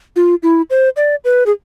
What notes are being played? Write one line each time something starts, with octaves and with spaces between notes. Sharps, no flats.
F4
E4
C5
D5
B4
G#4